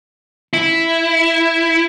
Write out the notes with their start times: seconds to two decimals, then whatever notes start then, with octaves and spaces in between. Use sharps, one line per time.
0.53 E4